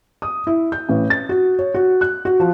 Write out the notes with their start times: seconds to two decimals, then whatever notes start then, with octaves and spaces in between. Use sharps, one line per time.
0.22 D#6
0.47 E4
0.72 G6
0.89 A1
1.10 A6
1.29 F#4
1.59 C#5
1.74 F#4
2.01 F#6
2.25 F#4
2.40 F3